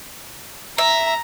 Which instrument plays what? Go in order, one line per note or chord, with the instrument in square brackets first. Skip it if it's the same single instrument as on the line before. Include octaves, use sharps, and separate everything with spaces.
[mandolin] E5 [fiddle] A#5